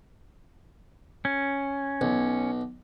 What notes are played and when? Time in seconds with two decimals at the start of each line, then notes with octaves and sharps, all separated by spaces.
1.25 C#4
2.01 B1